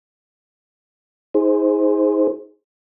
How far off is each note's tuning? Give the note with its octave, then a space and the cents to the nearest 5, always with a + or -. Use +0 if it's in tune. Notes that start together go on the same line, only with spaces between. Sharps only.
D#4 +35 G#4 +0 C5 +0